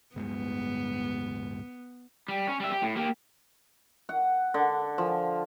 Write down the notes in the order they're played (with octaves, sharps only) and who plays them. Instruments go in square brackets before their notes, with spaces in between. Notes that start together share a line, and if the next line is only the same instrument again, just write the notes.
[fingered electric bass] D1 G2 G#3 [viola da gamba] B3
[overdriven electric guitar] G3
C#4
G3 E5
G4
A2
A#3 G4
[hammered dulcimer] F#5
D3
F3